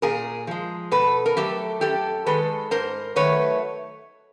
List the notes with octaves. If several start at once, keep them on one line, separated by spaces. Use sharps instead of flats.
A#2 G#4 A#4
F3 G#3
B2 A4 B4
A#4
F#3 A3 G4 A4
F#2 G4 A4
D#3 G#3 A4 B4
G#2 A#4 C5
D#3 F#3 A3 B4 C#5